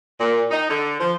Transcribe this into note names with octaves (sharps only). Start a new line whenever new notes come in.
A#2
D#4
D3
F3